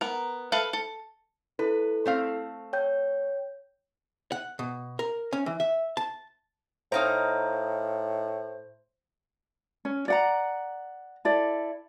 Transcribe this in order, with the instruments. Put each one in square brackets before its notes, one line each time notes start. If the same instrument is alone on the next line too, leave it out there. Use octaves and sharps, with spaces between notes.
[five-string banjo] B3 A#4
A4 B4 E5 F5
A4
[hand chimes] E4 A4 [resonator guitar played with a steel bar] B4
[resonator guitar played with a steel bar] A3 C4 F5
[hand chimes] C#5 G5 G6
[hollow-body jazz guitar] F#5
B2
A#4
C#4
E3
E5
A5
[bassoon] A2 [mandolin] D#4 F5 A#5 [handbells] C5
[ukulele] C#4
D5 F#5 A#5
E4 A4 D5